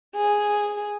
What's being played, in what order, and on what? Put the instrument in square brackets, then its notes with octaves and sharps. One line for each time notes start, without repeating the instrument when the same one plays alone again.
[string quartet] G#4